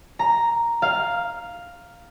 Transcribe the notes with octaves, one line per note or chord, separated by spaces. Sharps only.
A#5
F5